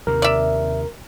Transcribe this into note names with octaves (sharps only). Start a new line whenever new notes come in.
D#2 C3 A#4
D5 E5